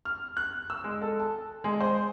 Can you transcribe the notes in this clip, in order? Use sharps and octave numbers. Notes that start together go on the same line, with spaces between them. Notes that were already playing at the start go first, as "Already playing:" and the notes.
F6
F#6
E6
G#3
A4
A5
G#3
C5